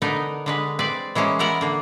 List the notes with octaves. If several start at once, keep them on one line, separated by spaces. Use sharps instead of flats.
D3 B3 D#4 A#4
D3 G#3 B4
C4 B4 D5
E3 G#3 A#3 C#4
B3 E4 A#4 F#5
D3 A#3